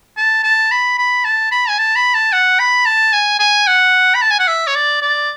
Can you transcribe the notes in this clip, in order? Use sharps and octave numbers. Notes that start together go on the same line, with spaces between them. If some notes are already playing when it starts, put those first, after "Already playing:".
A5
A5
B5
B5
A5
B5
G#5
A5
B5
A5
F#5
B5
A5
G#5
G#5
F#5
B5
A5
G#5
F#5
E5
C#5
D5
D5